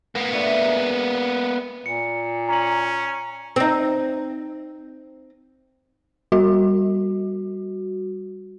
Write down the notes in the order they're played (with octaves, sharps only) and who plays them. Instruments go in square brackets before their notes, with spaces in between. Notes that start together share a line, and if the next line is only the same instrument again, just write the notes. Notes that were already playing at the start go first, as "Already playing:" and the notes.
[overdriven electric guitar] A#3 B3
[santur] A3 D4 E5
D#4 G#4
[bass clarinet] A#2 [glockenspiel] C#7
[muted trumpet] C#4 [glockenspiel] A#5 F#7
[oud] C4 D#4
[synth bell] G3 F#4